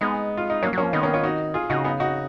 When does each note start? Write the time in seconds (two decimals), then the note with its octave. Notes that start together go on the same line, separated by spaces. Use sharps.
0.01 G#3 B3 D#4
0.37 F4
0.50 D#4
0.63 F#3 A#3 C#4
0.73 F#3 A#3 C#4
0.83 F3
0.93 D#3 B3 D#4
1.03 A#3 C#4
1.14 C#4 F4
1.23 D#4 F#4
1.54 F4 G#4
1.70 C#3 D#4 F#4
1.84 B3 D#4
2.00 D#4 F#4